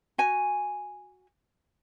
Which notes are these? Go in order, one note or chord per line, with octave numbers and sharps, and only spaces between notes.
F#4 G#5